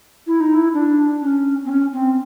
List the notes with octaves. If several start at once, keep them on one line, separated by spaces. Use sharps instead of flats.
E4
D#4
E4
D4
C#4
C4
C#4
C4